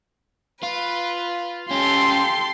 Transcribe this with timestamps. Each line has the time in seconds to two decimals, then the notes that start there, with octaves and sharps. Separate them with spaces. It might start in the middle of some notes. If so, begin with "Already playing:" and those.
0.63 F4 B4
1.71 C#4 F4 G4 A4 C6